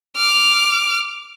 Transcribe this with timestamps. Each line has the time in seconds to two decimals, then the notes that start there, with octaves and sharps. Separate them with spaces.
0.16 D6 F6